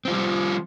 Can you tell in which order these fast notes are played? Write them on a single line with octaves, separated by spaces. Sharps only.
C4 F4 G3 F3